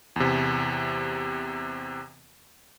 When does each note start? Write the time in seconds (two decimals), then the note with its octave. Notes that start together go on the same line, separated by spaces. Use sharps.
0.16 E2 C3